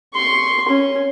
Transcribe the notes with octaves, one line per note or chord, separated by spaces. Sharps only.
C6 C#6
C#4